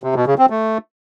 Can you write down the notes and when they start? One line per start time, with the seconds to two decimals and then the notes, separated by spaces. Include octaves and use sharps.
0.04 C3
0.15 B2
0.27 C#3
0.38 C4
0.50 A3